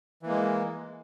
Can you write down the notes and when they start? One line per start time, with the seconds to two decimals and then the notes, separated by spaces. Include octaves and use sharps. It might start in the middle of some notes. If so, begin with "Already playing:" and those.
0.23 E3
0.26 A#3
0.29 G#3